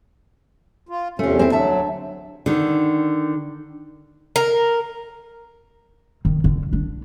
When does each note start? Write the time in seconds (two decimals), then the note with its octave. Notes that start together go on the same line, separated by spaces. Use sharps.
0.89 F4
1.19 E2 C3 A3 C#4 F4
1.39 C4 E4
1.52 D2 F#3 E5 A5
2.46 D3 D#3
4.36 A#4
6.25 D#3
6.44 D3
6.73 D4